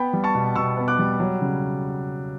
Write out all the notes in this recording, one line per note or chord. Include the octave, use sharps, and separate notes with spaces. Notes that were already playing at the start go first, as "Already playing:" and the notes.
Already playing: B3 G5 B5
G3
A5 C#6
B2
B2 C#6 E6
B3
D6 F#6
G3
F#3
C#3